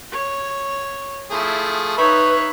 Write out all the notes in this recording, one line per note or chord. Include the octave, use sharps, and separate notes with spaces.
C#5
F3 A3 E4 G#4
D#4 B4 C#5 E5 B5 C#6